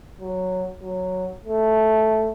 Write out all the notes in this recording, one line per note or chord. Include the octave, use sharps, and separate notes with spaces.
F#3
F#3
A3